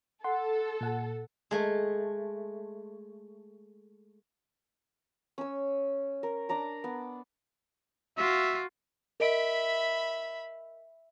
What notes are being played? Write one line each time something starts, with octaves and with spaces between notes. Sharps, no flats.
A4 F#5 C6
A#2 F#5
G#3 A3
C#4 E6
A#4
D4 D5 A#5 D6
B3
F4 F#4 E5
A#4 D#5 E5 B5 D7